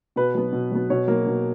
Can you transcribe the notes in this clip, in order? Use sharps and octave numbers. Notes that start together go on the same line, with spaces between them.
B2 B4
F#3 B3
B2
F#3 B3
B2 C#5
F#3 A#3
B2